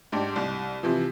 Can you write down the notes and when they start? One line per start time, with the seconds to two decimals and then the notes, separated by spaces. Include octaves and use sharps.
0.12 G#2 D4 G4
0.36 C2
0.83 C3 E3 F3